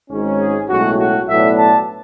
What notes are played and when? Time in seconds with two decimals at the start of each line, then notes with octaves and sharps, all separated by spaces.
0.10 G#1 G#2 G#3 C#4
0.39 G#4
0.69 B1 A2 G#3 C#4 F#4
0.99 F#4
1.28 B1 A2 F#3 B3 D4 E5
1.58 A5